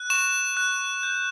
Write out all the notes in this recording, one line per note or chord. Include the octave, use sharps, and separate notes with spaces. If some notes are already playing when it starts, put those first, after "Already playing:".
Already playing: F#6
C#6 E7
F#6
G6